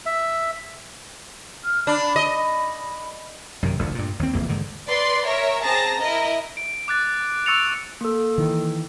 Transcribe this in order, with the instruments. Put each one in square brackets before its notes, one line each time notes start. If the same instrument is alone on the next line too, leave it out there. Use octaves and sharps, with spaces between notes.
[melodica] E5
[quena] F6
[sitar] D4 [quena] B5
[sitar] D#5
[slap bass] F#2 C3 D#3
F1 D2
G2 A#2
D#2 C4
F1 E2 A#3
G#2 D3 D#3
[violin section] B4 D5 C6
A#4 C#5 E5
C4 G#4 A5 A#5 A#6
E4 A#4 D#5
[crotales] D7
D6 F#6 A6
C#6 E6 A6 C#7 D7 F7
[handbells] A#3 A4
[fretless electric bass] D#3 E3